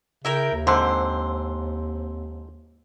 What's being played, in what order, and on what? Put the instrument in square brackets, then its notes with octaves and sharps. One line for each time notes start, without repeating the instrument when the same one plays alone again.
[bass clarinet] C#3 [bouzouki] E4 A#4 G5
[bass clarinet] D#2
[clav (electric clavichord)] G#2 D3 [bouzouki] C4 [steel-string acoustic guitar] C5